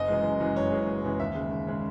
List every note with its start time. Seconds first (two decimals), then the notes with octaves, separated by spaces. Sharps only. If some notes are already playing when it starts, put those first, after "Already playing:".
Already playing: F#1 D#5
0.08 F#2 E3 G#3
0.24 F#1
0.40 F#2 E3 G#3
0.56 F#1 C#5
0.72 F#2 E3 G#3
0.87 F#1
1.04 F#2 E3 G#3
1.19 D#2 E5
1.35 C#3 G#3
1.51 D#2
1.67 C#3 G#3